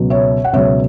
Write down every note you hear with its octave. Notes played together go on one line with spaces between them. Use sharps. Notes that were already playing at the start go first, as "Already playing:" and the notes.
Already playing: C#2 B2 F#3
C#5 E5
F#5
C#2 B2 F#3 C#5 E5